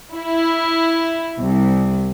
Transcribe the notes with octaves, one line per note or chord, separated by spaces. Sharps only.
E4
C2